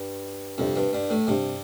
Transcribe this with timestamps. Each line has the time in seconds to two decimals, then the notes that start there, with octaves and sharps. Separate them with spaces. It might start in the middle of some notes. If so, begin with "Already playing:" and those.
Already playing: G2
0.58 F2 C3 G3 D4 G4 C5
0.76 G2
0.93 G2
1.10 A2
1.27 G2 C3 G3 D4 G4 C5